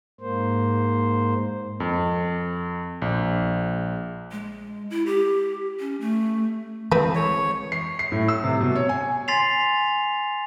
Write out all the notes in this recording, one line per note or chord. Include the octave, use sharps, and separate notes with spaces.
G#2 A#3 C5
F2
A#1
G#3
E4
G4
C#4
A3
E3 G#3 C4 B4
C#5
C7
C7
A2
E6
C3
B2
C#5
G#5
G#5 C6 A6 B6 C7 F7